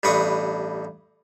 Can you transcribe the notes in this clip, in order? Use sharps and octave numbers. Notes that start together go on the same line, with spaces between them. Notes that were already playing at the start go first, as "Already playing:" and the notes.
A1 G2 B4 C#6 D#6